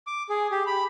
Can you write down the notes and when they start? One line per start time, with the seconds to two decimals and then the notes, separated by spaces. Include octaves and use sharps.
0.07 D6
0.29 G#4
0.51 G4
0.66 B5